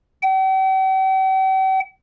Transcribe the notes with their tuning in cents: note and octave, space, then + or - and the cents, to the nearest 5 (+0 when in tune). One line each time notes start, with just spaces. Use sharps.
G5 -45